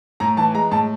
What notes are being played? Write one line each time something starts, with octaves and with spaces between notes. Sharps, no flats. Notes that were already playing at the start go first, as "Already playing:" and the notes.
A2 A#5
E3 A5
G#3 A#5
A2 A5